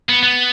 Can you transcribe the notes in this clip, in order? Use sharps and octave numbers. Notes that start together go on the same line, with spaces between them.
B3
B3